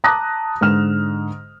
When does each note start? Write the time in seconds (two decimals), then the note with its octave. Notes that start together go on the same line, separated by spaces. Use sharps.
0.04 A5 A#5 D6 D#6 F#6 A#6
0.61 G#2 D3 F6 E7